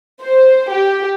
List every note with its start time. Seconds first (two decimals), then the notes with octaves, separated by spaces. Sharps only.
0.22 C5
0.71 G4